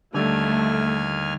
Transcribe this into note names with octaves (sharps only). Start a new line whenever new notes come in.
D#2 D3 G3 A3 G#5 F6